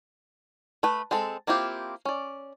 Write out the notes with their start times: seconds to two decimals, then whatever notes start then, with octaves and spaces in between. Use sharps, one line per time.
0.83 A3 B4
1.11 G#3 C4 A4
1.47 A#3 C4 E4 F4 G4
2.05 C#4 D5